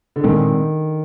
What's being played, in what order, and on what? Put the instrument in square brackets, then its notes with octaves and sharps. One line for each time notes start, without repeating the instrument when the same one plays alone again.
[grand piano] D3
[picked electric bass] A#2 G#3 C4 [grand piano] D#3